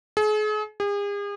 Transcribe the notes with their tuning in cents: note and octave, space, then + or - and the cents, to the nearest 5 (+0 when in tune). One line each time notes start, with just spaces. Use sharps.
G#4 +40
G#4 -40